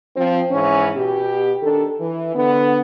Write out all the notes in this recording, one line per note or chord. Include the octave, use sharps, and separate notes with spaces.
F3 C4
G#2 E3 C#4
B2 G4
D#3 D4 A4
E3
D3 B3